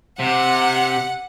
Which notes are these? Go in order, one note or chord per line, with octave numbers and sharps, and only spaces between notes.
C3 F#5